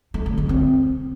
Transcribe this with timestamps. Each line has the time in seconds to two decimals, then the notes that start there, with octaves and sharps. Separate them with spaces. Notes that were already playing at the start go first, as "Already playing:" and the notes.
0.14 A3
0.26 D3
0.38 G#3
0.49 C4